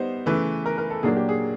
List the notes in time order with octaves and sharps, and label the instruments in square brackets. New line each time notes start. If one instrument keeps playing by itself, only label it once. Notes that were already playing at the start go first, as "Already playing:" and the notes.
Already playing: [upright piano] G3 B3 D#4 C5
C#3 E3 A3 B4
A#4
A#4
A4
A#2 F#3 A#3 D4 G#4
G4
G#4